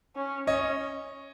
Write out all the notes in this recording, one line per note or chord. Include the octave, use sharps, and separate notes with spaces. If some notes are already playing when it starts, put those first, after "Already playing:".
C#4
C#4 C#5 D#5